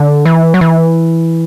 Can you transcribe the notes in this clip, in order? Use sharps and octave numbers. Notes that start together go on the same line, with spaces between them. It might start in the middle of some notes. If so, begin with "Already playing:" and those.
Already playing: D3
E3
F#3
E3